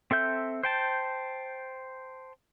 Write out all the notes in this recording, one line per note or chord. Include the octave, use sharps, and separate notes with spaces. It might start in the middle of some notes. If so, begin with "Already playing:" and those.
C4 A4 E5 G6
C5 G5 A5